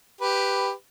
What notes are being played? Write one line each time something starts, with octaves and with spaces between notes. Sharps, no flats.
G4 B4